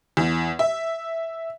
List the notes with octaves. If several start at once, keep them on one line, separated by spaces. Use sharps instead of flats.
E2
E5